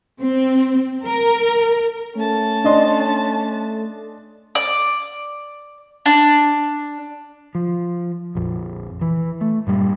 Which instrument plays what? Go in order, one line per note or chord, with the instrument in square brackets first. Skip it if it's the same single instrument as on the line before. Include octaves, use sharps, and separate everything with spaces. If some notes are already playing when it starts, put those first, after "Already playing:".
[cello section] C4
A#4
[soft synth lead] A3 [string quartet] C#4 A5
[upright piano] D4 D#5 C6
[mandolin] D5
D4
[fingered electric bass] F3
A#1 F2
E3
A3
G2 A#2 G3